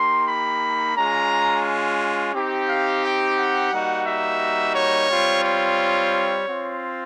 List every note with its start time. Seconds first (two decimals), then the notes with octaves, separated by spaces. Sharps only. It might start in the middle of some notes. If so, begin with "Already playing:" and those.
Already playing: A#3 D#4 G4 C6
0.28 B5
0.97 G#3 C#4 F4 A#5
2.34 C4 D#4 G4
2.68 F5
3.03 G5
3.37 F#5
3.71 G3 A#3 D#4 F#4
4.06 E5
4.75 C#5
5.09 G3 C4 F4
5.44 C#5
6.47 C4 F4